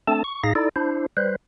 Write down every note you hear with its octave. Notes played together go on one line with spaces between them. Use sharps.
A3 C4 D4 A4 A5
C#6
A2 D#4 G#4 F5 A#6
D#4 E4 A4 D5
D4 E4 C5
G3 B4 C5